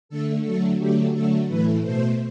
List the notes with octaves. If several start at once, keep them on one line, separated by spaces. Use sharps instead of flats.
D3 A3 A4
D3 F#3 A3 A4
D3 F#3 A3 G4
D3 F#3 A3 A4
A2 E3 A3 B4
B2 A3 C5